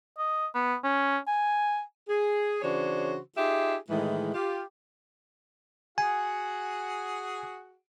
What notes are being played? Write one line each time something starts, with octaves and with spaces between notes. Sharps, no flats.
D#5
B3
C#4
G#5
G#4
C#3 E3 D4 F#4 C5 C#5
D#4 F4 G4 G#4 E5
A2 D#3 E3 G#3
F4 G4
F#4 G#4 F#5 G#5